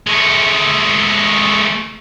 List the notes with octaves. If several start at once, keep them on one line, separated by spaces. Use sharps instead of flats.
G#3 A3